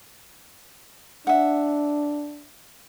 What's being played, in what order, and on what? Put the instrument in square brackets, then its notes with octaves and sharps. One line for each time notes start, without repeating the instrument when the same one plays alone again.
[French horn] D4 [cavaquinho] E5 F#5